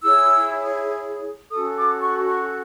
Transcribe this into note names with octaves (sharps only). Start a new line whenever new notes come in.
E4 G#4 C#5 E6
C#4 F#4 A4 D#6
D6
C#6
C#6